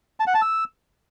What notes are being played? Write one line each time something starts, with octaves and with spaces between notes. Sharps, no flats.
A5
F#5
A5
E6